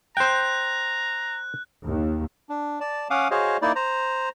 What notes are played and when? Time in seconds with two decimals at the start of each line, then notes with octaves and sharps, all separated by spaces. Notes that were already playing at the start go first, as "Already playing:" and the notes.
0.17 C5 G5 A#5 F#6
1.86 D#2
2.49 D4
2.81 D5 A5
3.10 C#4 F5 F#5 D6 D#6
3.31 F#4 G#4 C5 C#5 D#5 F5
3.62 A#3 D#4 E4 D5
3.76 C5 A#5